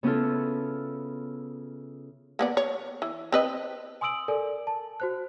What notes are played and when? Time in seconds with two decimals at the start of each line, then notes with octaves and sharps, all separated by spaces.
0.03 C#3 B3 C#4 E4 F4 A4
2.39 A#3 B3 D5
2.57 C#5
3.02 E3
3.32 C4 B4 D#5
4.01 G#5 C6 D#6 E6 D7 F#7
4.28 A4 A#4 D5 G#5
4.67 A5
5.00 F#4 C5 F#6